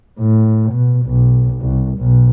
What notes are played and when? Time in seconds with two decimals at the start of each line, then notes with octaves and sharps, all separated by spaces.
0.19 A2
0.72 B2
1.06 B1
1.61 C2
1.98 B1